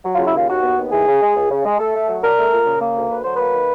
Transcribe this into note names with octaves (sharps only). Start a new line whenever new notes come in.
F#3
F4
C#3
E4
D#2 F4
D#2 F#4
B3
D#2
E3 G#4
C#3
G#3
C#2
C#3
G#3
A3 A4
A3
F#3
D4 A#4
A3
A#2
C#3
A#3
D2
D2 B4
F#3 C5
A#3 B4
D#3